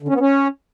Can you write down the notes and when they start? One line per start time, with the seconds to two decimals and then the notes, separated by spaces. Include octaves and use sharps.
0.02 D3
0.08 C#4
0.14 B3
0.20 C#4